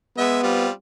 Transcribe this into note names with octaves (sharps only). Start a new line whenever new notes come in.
G#3 B3 E5
G3 C4 F4